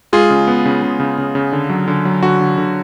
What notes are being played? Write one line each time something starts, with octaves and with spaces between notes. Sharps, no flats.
G#3 F4 G#4
C#3
B3
C#3
C#3
C#3
C#3
C#3
D3
F#3
D3
F#3
D3 F#4
D3
D3